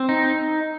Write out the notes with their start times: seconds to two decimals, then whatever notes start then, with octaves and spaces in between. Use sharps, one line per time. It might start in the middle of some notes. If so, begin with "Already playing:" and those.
Already playing: C4
0.09 D#4